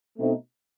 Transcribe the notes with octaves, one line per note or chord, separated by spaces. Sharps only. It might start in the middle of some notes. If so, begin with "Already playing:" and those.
B2 A3 C4 D#4